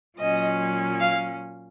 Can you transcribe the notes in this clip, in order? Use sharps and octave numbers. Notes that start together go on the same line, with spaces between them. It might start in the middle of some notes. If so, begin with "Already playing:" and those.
A#2 F#3 C#4 D#5
F5